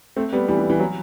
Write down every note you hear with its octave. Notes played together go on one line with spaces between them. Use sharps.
A3 C4
G3 B3
E3 G3
E3
E3
F#3